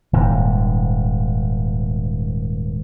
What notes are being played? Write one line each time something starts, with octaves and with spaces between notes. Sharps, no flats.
D#1 G#2